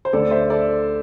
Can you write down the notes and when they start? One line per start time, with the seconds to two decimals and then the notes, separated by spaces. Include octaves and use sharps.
0.05 C5
0.13 D2 D3 A4 D5
0.31 C5 E5
0.50 A4 D5